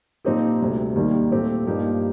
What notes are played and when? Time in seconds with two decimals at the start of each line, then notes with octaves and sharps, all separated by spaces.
0.24 A#2 F3 C4 D#4 G4
0.60 D2 C3 G3
0.95 D#2 D#3 G3 A#3
1.31 A#2 A3 C4 G4 C5
1.67 G2 F3 A#3 D#4 G4